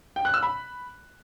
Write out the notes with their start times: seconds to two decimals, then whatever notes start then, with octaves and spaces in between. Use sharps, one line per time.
0.16 G5
0.25 F#6
0.34 E6
0.43 B5